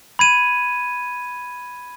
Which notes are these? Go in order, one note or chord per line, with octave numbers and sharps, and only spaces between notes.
B5 G#6 D#7